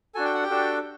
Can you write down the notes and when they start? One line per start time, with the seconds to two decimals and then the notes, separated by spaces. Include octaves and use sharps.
0.15 D4 F#4 A4 G#5
0.25 G5
0.34 F#5
0.43 G4 G5
0.50 D4 F#4 A4